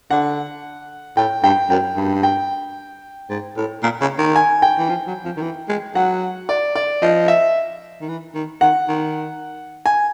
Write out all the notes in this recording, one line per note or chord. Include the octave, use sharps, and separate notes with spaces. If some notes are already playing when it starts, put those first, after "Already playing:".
D3 F#5
A2 G5
G2 G5
F#2 G5
G2
G5
G#2
A2
A#2
C#3
D#3
G#5
G5
E3
F3
F#3
F3
D#3
E3
G#3
F#3 F#5
D5
D5
F3 D#5
E5
D#3
E3
D#3
D#3 F#5
D#3
G#5